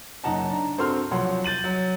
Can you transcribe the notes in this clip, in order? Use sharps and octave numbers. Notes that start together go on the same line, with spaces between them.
F#1 F#2 D#4 F#5 A5 A#5
D4 A#5
G2 C4 F#4 A4 C6 F6
C2 F3 F#3 C#5 F#5 C6
G6 A6 D#7 F#7
F#3